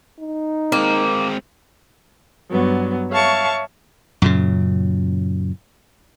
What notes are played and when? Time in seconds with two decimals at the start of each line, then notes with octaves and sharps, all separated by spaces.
0.19 D#4
0.72 G#3 A#3 C4
2.50 G2 F#3 B3
3.11 C#5 E5 F5 A5 C#6
4.22 F#2 A#2 C#3